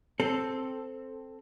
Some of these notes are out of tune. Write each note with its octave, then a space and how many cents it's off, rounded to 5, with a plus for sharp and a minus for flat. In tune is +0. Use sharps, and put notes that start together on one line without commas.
C4 +0 A4 +0